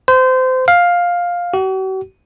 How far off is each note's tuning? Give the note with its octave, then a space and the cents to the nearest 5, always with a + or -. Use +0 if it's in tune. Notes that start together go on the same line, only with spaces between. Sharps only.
C5 -25
F5 +10
F#4 +45